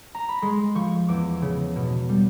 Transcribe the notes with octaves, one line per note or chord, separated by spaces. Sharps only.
A#5
B5
G#3 C6
F3 C#6
E2 D6
C#3
B2
G3